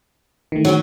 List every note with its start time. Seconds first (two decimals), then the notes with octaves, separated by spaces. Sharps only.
0.52 D#3 E3 A3
0.65 F#3 C#4 F#4